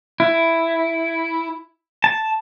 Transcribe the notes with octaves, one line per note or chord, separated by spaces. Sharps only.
E4
A5